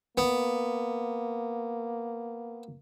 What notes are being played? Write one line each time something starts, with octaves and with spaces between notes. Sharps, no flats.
A#3 B3